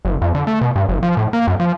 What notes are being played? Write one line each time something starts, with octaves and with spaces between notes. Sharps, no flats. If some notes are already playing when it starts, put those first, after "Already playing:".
F#1
F2
D3
A3
B2
G2
F#1
F3
A2
A#3
F#2
F3